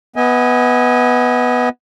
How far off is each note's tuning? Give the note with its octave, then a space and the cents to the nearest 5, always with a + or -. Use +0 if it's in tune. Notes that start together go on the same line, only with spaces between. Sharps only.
B3 +0 D#5 +40 G#5 -15